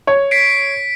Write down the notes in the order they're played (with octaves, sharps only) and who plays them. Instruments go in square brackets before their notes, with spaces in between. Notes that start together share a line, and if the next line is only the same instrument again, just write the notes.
[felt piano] C#5
[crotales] B6 C7 D7